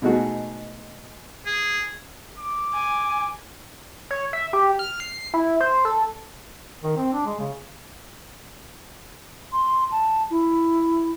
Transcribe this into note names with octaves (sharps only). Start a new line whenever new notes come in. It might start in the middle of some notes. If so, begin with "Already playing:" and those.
B2 G#3 A3 D#4 F#4 G#4
G#4
D6
G#5
C#5
E5
G4
F6
C7
E4
C5
A4
D#3
C4
D4
G#3
C#3
C6
A5
E4